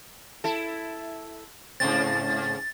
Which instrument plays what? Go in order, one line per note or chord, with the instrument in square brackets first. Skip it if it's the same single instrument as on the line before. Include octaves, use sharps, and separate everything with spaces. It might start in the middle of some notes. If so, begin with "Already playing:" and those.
[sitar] E4 A4
[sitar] G#2 C#3 C4 [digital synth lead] A6